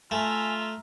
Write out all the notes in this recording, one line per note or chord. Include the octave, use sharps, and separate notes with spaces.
A3 F4 E5 G#5 A#5